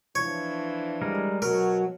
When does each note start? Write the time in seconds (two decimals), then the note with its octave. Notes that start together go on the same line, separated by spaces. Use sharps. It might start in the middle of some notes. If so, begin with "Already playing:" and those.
0.15 E3 F3 D4 C#5
1.01 G3 G#3 A#4
1.42 B2 F#3 F#4 A#4 C#5